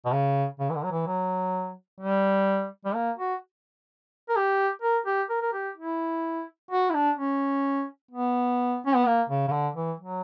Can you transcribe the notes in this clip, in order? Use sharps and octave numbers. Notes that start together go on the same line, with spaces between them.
B2
C#3
C#3
E3
D3
F#3
E3
F#3
G3
G3
A#3
F#4
A#4
G4
A#4
G4
A#4
A#4
G4
E4
F#4
E4
D4
C#4
B3
C#4
B3
A#3
C#3
C#3
D3
E3
F#3